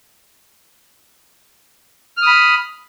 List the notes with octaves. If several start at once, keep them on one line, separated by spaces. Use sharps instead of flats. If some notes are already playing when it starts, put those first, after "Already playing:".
B5 D#6 F6